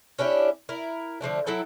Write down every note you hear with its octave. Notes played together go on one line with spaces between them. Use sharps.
C#4 D4 E4 G4
E4 A#4
D3 F3 A3 D4
F#3 E4 A4 G5